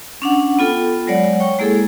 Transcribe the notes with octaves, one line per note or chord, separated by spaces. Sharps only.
C#4 D4 F#5
B3 F4 A4 G5
F#3 G#3 C#5 D5 F#5
C#5 G5 C#6
G#3 A#3 E4 G#4 A4